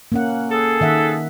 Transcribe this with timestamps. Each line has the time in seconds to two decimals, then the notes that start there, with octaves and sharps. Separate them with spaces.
0.12 A#3 C#4 F#5
0.50 G#4 A4
0.81 D#3 E5 F#5